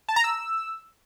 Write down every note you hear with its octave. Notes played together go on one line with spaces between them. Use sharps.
A5
A#5
E6